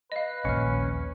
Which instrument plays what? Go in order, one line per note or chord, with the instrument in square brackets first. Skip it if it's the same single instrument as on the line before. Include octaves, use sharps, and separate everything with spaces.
[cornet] B4 [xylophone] D#5 F5
[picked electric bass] A#1 D#2 [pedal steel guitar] C#4 [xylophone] F6 C#7